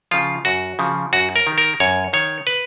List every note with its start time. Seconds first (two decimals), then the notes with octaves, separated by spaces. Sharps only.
0.11 C#3 F3 F4
0.45 F#2 F#4
0.79 C#3 F3
1.13 F#2 F#4
1.36 A#4
1.47 D#3
1.58 A#4
1.80 F#2 C#5
2.13 D#3 C#5
2.47 B4